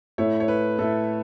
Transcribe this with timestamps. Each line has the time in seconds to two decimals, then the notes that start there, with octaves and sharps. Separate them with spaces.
0.18 A2 A3 E4 C#5
0.40 C#5
0.48 B4
0.78 A2 A3 E4 A4